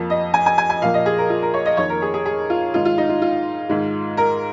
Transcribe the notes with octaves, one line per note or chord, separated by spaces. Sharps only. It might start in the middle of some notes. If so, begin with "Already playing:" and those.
Already playing: F2 F3 A#3
D#5
G#5
G#5
G#5
G#5
A#2 F3 A#3 F5
D#5
G#4
A#4
F4
A#4
C#5
D#5
F2 D#3 A#3 C#5
A#4
G#4
G#4
G#4
F4
G#2 D#3 G#3 F4
F4
D#4
F4
F4
G#2 D#3 G#3
A#4